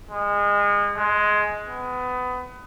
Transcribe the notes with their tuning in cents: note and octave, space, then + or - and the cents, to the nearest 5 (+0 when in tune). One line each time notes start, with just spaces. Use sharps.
G#3 -30
G#3 +10
B3 +25